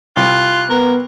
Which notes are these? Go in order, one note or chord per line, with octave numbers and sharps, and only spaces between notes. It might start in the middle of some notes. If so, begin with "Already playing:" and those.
C2 F4 F#6
B3 A#4